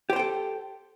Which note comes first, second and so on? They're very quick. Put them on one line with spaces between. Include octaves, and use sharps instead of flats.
G4 C5 G5 A4